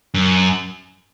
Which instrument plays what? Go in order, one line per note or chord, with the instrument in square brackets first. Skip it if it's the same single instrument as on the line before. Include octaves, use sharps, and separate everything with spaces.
[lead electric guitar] F#2